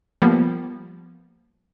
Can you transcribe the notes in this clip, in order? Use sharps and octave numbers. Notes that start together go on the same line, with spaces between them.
F3 G3 A#3 B3